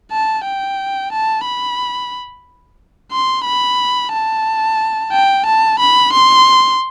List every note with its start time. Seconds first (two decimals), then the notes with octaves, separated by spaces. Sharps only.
0.12 A5
0.45 G5
1.12 A5
1.45 B5
3.12 C6
3.45 B5
4.13 A5
5.13 G5
5.46 A5
5.79 B5
6.13 C6